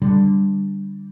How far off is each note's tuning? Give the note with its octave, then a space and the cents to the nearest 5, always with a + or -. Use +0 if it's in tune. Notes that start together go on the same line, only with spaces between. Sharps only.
D3 +0 G3 +0